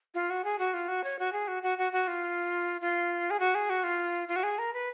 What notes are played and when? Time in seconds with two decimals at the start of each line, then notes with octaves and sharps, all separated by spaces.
0.14 F4
0.30 F#4
0.44 G#4
0.59 F#4
0.74 F4
0.88 F#4
1.04 C#5
1.19 F#4
1.33 G#4
1.48 F#4
1.63 F#4
1.78 F#4
1.93 F#4
2.08 F4
2.81 F4
3.30 G#4
3.40 F#4
3.55 G#4
3.70 F#4
3.84 F4
4.28 F4
4.36 F#4
4.43 G#4
4.59 A#4
4.73 B4